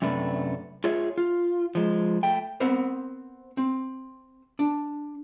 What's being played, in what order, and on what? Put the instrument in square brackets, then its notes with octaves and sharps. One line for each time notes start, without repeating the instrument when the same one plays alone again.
[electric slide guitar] F#2 C3 A3 D4 B4
F4 G#4 C#5 E5
F4
F3 G#3
A3 G5
[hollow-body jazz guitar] B3 C4 A#4 C5
C4
D4